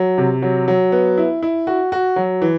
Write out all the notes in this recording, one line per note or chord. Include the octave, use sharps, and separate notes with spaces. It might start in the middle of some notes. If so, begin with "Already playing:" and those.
Already playing: F#3
C3
F#3
F#3
B3
E4
E4
F#4
F#4
F#3
E3